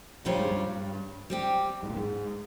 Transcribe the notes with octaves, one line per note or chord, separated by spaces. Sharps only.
G2 A#2 G3 C#4 F4 C5
G#2
G2
G3 C4 G4
G#2
A#2
G#2